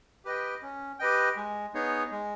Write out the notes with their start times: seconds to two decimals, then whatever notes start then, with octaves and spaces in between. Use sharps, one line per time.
0.25 G4 B4 D#5 G5
0.62 C#4
0.99 G4 B4 D#5 G5
1.36 G#3
1.74 B3 D#4 G#4 C#5
2.11 G#3